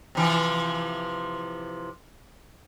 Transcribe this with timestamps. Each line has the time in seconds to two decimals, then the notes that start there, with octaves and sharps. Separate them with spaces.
0.15 C3 E3 F3